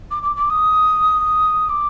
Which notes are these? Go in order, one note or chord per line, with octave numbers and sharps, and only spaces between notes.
D6
D6
D6
D#6
D6